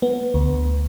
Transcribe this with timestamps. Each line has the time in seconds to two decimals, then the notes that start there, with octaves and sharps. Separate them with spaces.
0.02 B3
0.34 D2